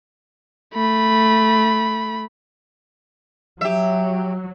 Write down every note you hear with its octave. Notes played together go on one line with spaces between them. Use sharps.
A3 B5
F#3 G4 E5